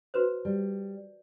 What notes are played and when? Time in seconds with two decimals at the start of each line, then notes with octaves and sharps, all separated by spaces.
0.14 F#4 B4 C5
0.45 G3